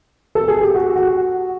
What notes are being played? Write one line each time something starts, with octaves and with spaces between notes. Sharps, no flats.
A4
G#4
G4
F#4
F#4